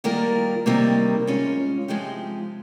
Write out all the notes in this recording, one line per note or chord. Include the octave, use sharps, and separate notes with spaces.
D#3 G3 A#3 F4 A#4
C3 D#3 G3 A#3 D#4
G#3 C#4 F4
C3 F3 G#3 D#4 G4